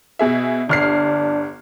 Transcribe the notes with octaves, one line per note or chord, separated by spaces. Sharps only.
B2 G#4 E5
G1 D4 F6 C7